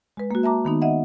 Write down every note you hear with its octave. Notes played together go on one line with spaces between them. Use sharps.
G#3 B4
A#3 F#4
E5 A5 A#5 D6
D#3 B3 D#4
D#5 E5 F#5